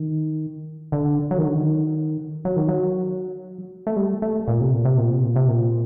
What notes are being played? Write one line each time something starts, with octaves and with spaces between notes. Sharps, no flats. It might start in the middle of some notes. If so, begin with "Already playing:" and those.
Already playing: D#3
D3
F#3
D#3
D3
D#3
F#3
D#3
F#3
A3
G3
A3
A#2
C3
A#2
C3
A#2
C3
A#2
C3
A#2